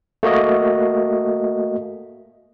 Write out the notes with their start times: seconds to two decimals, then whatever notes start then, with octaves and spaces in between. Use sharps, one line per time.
0.23 A3 A#3 F#4 D#5